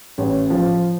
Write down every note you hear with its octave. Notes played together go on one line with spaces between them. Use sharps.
A1
F3